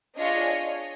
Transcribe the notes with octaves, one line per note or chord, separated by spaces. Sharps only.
D4 F4 G#4 C#5 D#5